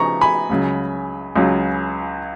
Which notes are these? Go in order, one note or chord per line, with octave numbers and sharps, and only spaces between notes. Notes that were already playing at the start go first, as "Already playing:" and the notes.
Already playing: C#3 F3 B3 D#4 A#5 C#6
G#5 B5
C#2 C#3 F#3
C#2 C#3 F#3